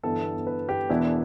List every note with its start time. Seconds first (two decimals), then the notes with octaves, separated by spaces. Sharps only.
0.03 G1 G2 E3 B3 A4
0.47 B4
0.69 G4
0.89 E1 E2 E3 B3 D4 E4